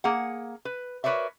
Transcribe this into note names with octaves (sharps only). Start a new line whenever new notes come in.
A#3 G#4 F#5
B4
F#4 A#4 B4 C#5 D5 E5